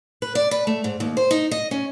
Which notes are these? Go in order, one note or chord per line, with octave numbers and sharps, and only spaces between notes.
B4
D5
B4
A3
G#2
D#2
C5
D#4
D#5
C#4